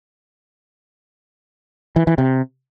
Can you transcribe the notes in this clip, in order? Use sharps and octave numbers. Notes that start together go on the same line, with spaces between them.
E3
E3
C3